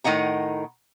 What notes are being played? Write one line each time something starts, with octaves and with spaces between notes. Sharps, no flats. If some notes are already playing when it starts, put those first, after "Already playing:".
A2 D#3 D#5 F#5 A#5